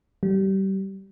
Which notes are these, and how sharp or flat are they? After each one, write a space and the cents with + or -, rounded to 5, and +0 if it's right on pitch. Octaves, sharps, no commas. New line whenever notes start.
G3 -25